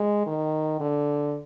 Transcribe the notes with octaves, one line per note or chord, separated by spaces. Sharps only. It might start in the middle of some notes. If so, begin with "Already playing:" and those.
Already playing: G#3
D#3
D3